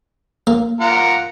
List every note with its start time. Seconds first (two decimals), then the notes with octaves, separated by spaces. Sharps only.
0.47 A#3
0.81 F4 A#4 F#5